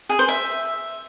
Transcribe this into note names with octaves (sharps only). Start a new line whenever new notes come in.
G#4
C5
E5